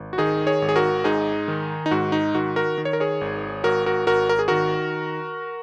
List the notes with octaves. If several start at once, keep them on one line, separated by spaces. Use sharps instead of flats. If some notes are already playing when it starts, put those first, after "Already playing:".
Already playing: G#1
F#4
D#3 D#4 G#4
G#4 C#5
G#1
G#4
F#4 A#4
G#2 D#4 G#4
D#3
D#4
G#2 F#4
D#4
D#3 F#4
F#4 A#4
D#3
C#5
A#4
G#4 C#5
G#1
G#1 F#4 A#4
F#4 A#4
G#1 F#4 A#4
A#4
G#4
D#3 F#4 A#4